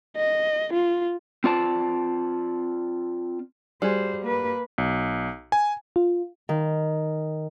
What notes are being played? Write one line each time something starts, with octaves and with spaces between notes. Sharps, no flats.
D#5
F4
C4 F4 D5 A5
G3 F#4 G#4 C5
A#3 B4
B1
G#5
F4
D#3